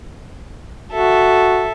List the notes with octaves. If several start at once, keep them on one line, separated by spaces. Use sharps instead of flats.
F#4 A4 E5